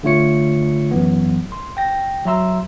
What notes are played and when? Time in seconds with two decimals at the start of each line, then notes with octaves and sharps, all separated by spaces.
0.03 D3 A3 F4 C#5 C#7
0.91 F#2 E3 F#3 B3
1.52 C6
1.77 G5 A#6
2.25 F#3 E5 A#5 C6 E6